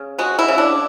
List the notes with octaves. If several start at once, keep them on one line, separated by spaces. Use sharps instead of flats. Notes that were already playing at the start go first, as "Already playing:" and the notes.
Already playing: C#3
G#3 F#4
E4
C#3
D4